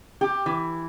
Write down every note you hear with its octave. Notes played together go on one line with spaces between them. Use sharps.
G4
E3